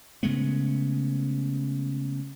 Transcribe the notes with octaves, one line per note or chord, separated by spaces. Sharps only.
C#3 G#3 A3 B3